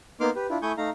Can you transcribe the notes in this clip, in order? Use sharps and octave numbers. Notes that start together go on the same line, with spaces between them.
A#3 B3 D#4 C6 D6 F6
G4 B4
D4 E4 F4
A3 E4 G#5 C#6 D#6 G6
A3 D#4 F5 A#5